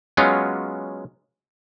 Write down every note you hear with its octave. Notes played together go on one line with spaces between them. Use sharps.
F#3 G#3 B3 C#4 F4